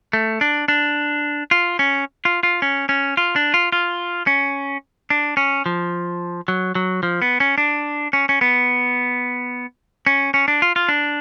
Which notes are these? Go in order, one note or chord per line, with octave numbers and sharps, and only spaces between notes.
A3
D4
D4
F4
C#4
F4
F4
C#4
C#4
F4
D4
F4
F4
C#4
D4
C#4
F3
F#3
F#3
F3
B3
C#4
D4
C#4
C#4
B3
C#4
C#4
D4
F4
F4
D4